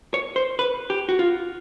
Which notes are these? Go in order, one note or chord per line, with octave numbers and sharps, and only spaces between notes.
C#5
C5
B4
G4
F#4
F4